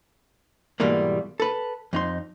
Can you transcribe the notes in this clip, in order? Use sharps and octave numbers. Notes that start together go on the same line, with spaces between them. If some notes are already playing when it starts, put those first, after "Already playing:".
G#2 B2 E3 G3 G#3 A#3
A4 B4
F2 D#4 C6